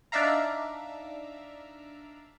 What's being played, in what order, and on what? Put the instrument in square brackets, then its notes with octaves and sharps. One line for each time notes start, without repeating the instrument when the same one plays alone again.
[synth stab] D4 D#4 D5 E5 F5 A#5